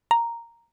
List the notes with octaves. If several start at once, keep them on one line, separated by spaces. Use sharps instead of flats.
A#5